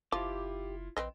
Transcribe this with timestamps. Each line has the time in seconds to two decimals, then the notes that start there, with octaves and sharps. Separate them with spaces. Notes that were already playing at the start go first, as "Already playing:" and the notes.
0.12 F#1 F3 E4 F4 G4 D6
0.97 A#1 C4 B4 D#5